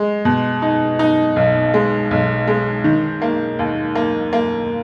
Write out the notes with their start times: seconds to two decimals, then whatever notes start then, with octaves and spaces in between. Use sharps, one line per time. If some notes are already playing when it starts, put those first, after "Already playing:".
Already playing: G#3
0.25 B2
0.62 D#4
0.99 D#4
1.36 B1
1.74 G#3
2.11 B1
2.47 G#3
2.84 D#3
3.22 A#3
3.59 D#2
3.95 A#3
4.33 A#3